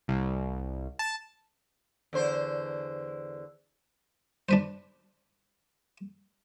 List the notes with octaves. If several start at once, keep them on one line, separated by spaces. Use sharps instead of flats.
C2
A5
E2 D3 C5
D4 B4 C5